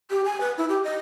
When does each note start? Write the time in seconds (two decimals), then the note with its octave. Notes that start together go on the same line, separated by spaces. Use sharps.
0.10 G4
0.25 G#5
0.41 B4
0.57 E4
0.69 G4
0.84 D#5